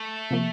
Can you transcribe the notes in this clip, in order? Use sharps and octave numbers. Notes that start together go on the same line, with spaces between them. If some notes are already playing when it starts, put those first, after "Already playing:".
Already playing: A3
C3 F3 A#3